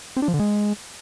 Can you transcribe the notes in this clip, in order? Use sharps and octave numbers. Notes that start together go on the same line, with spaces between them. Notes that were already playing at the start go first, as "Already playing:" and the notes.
C4
D4
F3
D3
G#3